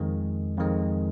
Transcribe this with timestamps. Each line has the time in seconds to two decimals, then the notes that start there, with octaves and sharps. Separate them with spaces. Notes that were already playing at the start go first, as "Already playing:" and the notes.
Already playing: F2 D#3 G#3
0.58 F2 D#3 G#3